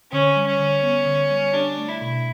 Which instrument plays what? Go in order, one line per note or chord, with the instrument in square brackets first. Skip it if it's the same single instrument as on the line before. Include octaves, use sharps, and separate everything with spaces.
[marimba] D3 [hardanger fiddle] C#4
[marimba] G3
[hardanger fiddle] C#4
[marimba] D3
B3
D3
G3
[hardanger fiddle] D4 [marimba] G4
[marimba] A3
[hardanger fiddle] E4
[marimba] B2